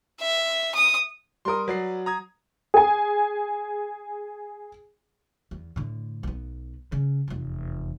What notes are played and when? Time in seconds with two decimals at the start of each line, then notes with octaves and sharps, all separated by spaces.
0.21 E5
0.75 D#6
1.45 G3 A#4 C6 D#6
1.68 F#3 B4 D5 C7
2.06 A#5 D#6 G#6
2.74 G#4 G#5
5.51 E2
5.76 A2 D3
6.23 B1 B3
6.92 C#3
7.28 F1 E2